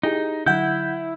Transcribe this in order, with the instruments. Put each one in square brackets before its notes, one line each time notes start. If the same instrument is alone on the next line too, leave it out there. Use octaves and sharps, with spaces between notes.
[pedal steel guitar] D#4 [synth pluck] E4 G4 G#4
[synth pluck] D3 F#3 [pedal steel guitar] E4 [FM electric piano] F#5 G6